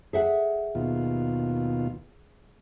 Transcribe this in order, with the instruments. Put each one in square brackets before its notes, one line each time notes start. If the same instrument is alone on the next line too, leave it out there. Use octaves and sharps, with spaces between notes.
[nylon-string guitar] G#4 E5 F#5
[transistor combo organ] D#2 B2 F4